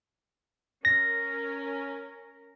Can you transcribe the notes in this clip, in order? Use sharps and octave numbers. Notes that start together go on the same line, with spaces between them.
C#4 A#4 A#6